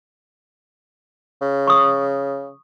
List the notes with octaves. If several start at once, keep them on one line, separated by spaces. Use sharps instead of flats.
C#3
C#6 D#6